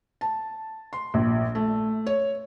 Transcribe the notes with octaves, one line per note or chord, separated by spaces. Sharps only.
A5
C6
A#1
A3
C#5